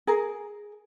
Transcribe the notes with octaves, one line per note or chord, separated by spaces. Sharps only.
G#4 A#4